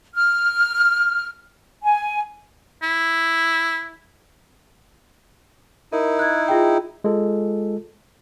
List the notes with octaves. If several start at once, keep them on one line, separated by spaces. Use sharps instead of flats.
F6
G#5
E4
D#4 E4 A#4
F#6 G#6
F4 G#4 G5
G#3 F4 A4